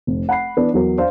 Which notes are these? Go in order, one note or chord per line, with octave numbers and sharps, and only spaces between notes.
F1
F#5 B5 C7
E3 B3 D4
E2 F#3 A#4
D4 C5 F5